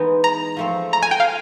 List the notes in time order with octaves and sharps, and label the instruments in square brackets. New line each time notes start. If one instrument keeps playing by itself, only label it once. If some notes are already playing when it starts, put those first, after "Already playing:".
Already playing: [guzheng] E3 G#3 B3 D#4
[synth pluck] A#5
[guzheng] F3 A3 C4
[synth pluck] A#5
G#5
G5
F5